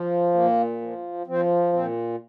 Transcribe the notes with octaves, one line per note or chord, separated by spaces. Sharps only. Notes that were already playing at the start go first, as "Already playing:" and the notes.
Already playing: F3
A#2 A#3
F3
F3 C4
A#2 C4